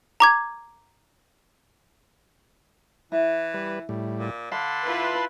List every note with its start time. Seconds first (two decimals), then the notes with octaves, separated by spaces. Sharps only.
0.20 A#5 D6 G#6
3.12 E3 E4
3.54 G3 B4
3.89 A2 G3
4.18 A#2
4.52 D3 F5 A5 B5 C6
4.86 E4 F4 B4